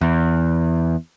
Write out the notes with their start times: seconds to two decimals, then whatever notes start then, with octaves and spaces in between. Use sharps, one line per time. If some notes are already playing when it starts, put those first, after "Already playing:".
0.01 E2